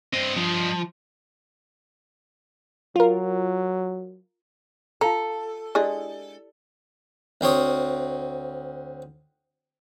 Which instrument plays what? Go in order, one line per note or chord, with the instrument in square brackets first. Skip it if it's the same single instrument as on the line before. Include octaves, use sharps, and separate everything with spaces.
[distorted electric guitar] G2 D#5 [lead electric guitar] C4
[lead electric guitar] F3
[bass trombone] F#3 [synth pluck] F4 A#4
[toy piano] F4 F5 A5 [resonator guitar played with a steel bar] A4 [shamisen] A#5
[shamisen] G#3 D4 G#4 [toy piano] E4 G4 D5
[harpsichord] D2 C4 C#5 D#6